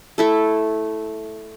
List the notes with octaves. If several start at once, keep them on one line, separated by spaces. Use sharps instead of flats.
A3 E4 A4